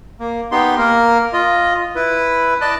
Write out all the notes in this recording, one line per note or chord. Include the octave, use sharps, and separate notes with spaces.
A#3
B3 D#4 G4 C6
A#3 A#4
F4 D#5
E4 B4
D5 D#5 A5 F#6